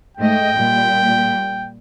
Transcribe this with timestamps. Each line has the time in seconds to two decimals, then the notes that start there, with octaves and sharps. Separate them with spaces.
0.17 G#2 A3 D#5 G5
0.56 A#2 G3